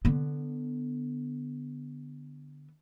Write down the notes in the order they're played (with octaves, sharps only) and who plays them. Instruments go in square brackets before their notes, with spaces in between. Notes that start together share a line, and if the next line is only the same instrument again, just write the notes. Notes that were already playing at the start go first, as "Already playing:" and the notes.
[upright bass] D3 B3